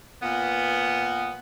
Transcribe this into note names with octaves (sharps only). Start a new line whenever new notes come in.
A#2 B3